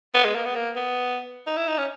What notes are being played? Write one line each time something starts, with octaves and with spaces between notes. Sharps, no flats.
B3
G#3
A#3
B3
A#3
B3
D#4
E4
D#4
C#4